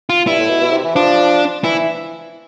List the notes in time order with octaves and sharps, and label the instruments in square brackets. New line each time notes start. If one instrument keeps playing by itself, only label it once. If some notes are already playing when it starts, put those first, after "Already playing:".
[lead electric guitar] F4
[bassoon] G2 [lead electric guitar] E4
[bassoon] A2
B2
B2
C3
E3
[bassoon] F3 [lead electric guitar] D4
[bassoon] E3 [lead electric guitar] E4